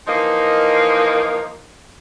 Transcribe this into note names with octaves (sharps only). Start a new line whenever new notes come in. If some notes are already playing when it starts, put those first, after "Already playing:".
E3 F3 A#3 D#4 A#4 D#5